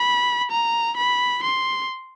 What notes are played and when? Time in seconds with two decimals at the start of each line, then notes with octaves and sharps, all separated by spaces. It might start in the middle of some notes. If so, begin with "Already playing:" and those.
Already playing: B5
0.51 A#5
0.97 B5
1.43 C6